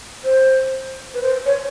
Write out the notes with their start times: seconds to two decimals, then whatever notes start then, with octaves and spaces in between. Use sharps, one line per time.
0.24 C5
1.14 B4
1.22 C5
1.46 C#5